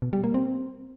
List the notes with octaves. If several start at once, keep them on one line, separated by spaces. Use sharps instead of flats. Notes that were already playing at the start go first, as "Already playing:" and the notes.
B2
G3
A#3
C4